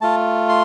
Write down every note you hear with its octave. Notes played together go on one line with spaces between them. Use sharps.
A3 F4 A5
C6